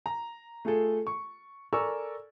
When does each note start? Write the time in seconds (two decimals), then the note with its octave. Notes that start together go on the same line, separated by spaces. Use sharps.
0.06 A#5
0.65 A3 F4 G#4 A4
1.07 C#6
1.73 A4 A#4 D5 G#5 C#6 E6